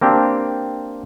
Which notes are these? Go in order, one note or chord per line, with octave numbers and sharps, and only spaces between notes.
A#3 C4 D4 G4